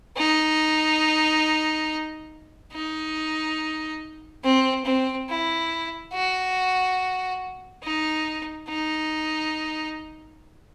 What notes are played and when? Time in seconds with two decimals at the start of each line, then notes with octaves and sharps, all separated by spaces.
0.17 D#4
2.73 D#4
4.43 C4
4.85 C4
5.28 E4
6.13 F#4
7.83 D#4
8.68 D#4